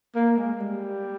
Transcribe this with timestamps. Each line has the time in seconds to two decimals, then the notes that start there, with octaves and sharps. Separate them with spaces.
0.15 A#3
0.38 G#3
0.60 G3